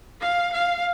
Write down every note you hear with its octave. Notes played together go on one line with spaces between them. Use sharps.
F5
F5